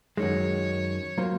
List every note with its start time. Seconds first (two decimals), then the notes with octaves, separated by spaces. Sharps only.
0.17 F#2 D#3 G#3 C#5
1.18 F#3 A#3 F4 C5